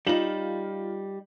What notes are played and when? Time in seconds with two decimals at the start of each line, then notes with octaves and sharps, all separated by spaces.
0.07 G3 D#4 F4 E7 F#7